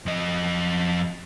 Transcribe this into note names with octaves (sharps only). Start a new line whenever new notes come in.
F2 D#5